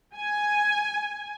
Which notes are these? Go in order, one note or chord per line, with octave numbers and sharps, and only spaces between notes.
G#5